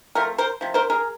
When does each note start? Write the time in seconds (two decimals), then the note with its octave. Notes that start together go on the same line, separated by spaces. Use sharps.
0.15 C3 F3 A3 A#4
0.38 A#4 C5
0.61 C3 F3
0.74 A#4 C5
0.90 G#4 A#4